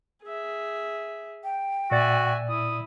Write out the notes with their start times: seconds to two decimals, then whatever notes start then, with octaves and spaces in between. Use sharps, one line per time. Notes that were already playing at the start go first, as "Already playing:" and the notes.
0.23 G#4 E5
1.44 G5
1.91 A#2 F#4 D5 E5 G#5 A6
2.49 E4 D#6